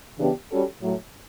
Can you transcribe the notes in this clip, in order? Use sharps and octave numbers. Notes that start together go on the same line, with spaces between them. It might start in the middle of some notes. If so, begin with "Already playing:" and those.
C#3 E3 B3 D4 G4
G3 C#4 F#4 A4
A2 F#3 A3